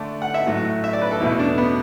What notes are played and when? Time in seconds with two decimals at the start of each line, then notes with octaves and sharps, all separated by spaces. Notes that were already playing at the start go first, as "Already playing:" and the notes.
Already playing: D3 A3 D4 D5
0.22 F#5
0.34 E5
0.47 A2 F#3 A3 F#4
0.84 E5
0.93 D5
1.02 B4
1.11 A4
1.20 E2 B2 A3 E4
1.39 D4
1.58 B3